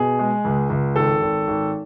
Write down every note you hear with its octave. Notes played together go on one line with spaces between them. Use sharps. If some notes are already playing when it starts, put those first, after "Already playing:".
Already playing: B2 G#4
G#3
C#2
C#2
G#1 A4
G#1
G#1